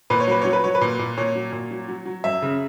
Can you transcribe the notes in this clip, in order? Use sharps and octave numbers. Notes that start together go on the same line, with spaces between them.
A#2 B4
C#5
F#3 B4
F#3 C#5
B4
F#3 C#5
B4
A#2
A#2
A#2 C#5
F#3
A#2
F#3
F#3
F#3
F#2 E5
C#3